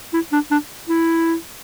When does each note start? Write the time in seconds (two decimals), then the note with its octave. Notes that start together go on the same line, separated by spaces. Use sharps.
0.14 E4
0.33 D4
0.51 D4
0.89 E4